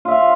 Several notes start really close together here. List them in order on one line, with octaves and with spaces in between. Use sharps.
F4 E5 F5